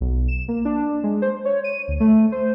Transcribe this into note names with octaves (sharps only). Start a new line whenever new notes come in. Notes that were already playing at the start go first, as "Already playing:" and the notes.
B1
E7
A#3
D4
G#3
C5
C#5
D#7
D2
A3
C5